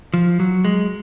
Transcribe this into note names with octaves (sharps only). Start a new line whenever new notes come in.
F3
F#3
G#3